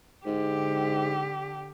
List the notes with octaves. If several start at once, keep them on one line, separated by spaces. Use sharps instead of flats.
G#2 D3 G4